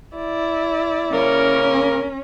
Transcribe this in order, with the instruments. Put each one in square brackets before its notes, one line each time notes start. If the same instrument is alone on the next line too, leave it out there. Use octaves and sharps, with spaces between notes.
[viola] E4 D5
[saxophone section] C#3 A#3 A#4 [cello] C#4